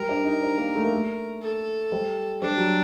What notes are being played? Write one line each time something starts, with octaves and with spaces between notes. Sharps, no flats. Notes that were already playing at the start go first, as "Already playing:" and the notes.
Already playing: G3 A#4
D4
D#4
D4
A#3
A3
A#3
A3
A4
G3
G3 D4
F#3